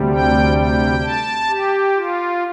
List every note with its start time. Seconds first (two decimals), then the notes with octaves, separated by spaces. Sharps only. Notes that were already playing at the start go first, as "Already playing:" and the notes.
Already playing: D2 C3 G3
0.12 G5
0.58 G5
1.03 A5
1.49 G4
1.96 F4